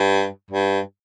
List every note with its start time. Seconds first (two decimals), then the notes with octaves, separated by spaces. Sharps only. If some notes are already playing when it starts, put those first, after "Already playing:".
Already playing: G2
0.51 G2